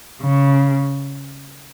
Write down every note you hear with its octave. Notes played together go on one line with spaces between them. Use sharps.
C#3